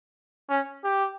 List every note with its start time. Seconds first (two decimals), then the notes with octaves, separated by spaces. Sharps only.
0.49 C#4
0.84 G4